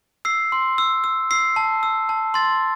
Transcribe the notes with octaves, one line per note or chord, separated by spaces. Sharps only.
E6 C7
C6
E6
E6
E6 C7
A5
E6
A5
C6 A6